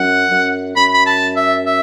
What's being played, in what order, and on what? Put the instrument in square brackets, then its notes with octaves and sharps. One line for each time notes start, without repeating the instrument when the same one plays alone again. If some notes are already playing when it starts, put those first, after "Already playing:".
Already playing: [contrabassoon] F#2 [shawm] F#5
[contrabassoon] F#2
[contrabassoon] F#2 [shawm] B5
[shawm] B5
A5
E5
E5